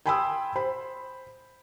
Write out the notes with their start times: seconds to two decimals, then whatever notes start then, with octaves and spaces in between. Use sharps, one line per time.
0.06 G5 G#5 B5 C6 D#6 E6
0.55 C5 B5